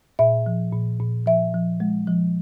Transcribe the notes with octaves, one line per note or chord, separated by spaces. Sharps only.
A#2 E5
F3
A#2
A#2
F3 E5
F3
G#3
F3